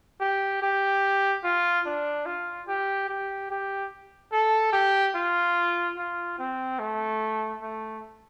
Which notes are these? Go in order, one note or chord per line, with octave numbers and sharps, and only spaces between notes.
G4
G4
F4
D4
F4
G4
G4
G4
A4
G4
F4
F4
C4
A3
A3